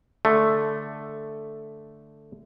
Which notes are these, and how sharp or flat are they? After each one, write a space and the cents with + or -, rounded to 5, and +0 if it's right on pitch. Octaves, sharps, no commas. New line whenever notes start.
D3 +0 A3 +0